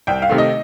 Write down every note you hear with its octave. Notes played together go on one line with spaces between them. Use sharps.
C2 G5
F5
C3 D#3 A3
D#5